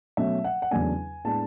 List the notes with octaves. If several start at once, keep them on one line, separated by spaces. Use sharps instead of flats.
B2 F#3 A3 C#4 E5
F#5
F#5
E2 C#3 F#3 A3 D4 G#5
A2 G#3 B3 D4 A5